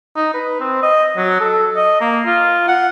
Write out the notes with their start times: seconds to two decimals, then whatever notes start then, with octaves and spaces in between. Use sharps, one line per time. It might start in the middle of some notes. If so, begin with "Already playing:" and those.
0.16 D#4
0.34 B4
0.60 C4
0.83 D#5
1.17 F#3
1.40 A4
1.76 D#5
2.01 A#3
2.26 F4
2.68 F#5